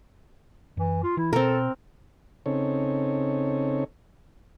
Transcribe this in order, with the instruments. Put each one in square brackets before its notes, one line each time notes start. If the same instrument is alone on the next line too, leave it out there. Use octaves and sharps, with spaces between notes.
[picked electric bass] F#2 [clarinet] E3
[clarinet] F4
[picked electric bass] E3 [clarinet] E4
[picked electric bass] B2 [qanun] C4 A#4 [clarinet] A4
[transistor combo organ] C#3 C4 D#4 A4 C#5